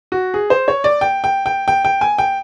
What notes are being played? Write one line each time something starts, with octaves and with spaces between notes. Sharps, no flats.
F#4
G#4
C5
C#5
D5
G5
G5
G5
G5
G5
G#5
G5